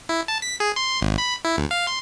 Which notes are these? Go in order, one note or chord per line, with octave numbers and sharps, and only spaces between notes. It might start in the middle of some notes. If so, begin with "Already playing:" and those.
E4
A5
B6
G#4
C6
G#1
B5
E4
D2
F5
C6